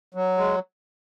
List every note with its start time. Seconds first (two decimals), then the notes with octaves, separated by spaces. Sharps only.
0.15 F#3
0.37 G#3